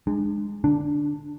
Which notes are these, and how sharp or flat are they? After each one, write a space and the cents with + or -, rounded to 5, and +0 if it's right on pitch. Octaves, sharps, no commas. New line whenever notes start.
G#3 -10 D4 +35
D3 +10 D4 +0